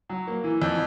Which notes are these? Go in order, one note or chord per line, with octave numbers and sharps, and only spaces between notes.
F#3
A#3
E3
F2